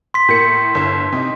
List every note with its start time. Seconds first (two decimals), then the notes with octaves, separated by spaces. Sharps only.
0.14 C6 B6
0.28 A2 A#3 C#7
0.75 G1
1.12 C3 D#4